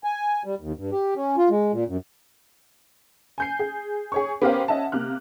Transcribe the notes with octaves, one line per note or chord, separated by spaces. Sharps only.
G#5
G3
D#2
G2
G4
C#4
F4
G#3
A#2
F#2
G#5 G6 C7
G#4
G#4 C#5 C#6
B3 C#4 G4 A#4 C5 F5
C#4 D#5 E5 F#5 A5
C3 A#3 F6 F#6